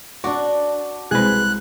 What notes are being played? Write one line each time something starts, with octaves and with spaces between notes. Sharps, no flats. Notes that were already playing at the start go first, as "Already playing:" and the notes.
D4 F#4 D6
C2 G#3 G#4 B4 C5 F#6